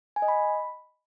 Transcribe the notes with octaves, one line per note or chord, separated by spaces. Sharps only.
G#5
D#5
B5